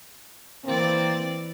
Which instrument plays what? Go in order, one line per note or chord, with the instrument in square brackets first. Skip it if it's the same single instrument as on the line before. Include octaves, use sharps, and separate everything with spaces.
[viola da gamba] E3 D5 [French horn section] A#3 C4